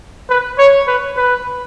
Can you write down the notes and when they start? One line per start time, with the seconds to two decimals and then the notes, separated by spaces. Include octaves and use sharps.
0.30 B4
0.59 C#5
0.88 B4
1.17 B4